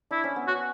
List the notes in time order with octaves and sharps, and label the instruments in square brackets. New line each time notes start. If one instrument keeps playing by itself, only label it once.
[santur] D4 [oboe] E4
[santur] C#4
B3
[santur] C#4 [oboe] F#4